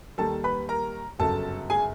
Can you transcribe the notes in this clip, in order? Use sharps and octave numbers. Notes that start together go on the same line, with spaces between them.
D#2 D#3 G3 A4 A5
B4 B5
A#4 A#5
G1 F#2 C#3 F#3 A4 A5
G#4 G#5